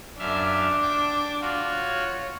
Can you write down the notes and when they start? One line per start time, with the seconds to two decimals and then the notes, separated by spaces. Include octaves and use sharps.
0.19 F#2 D4 E5 F5
0.82 G5 D6
1.41 F4 F#4
1.75 C#5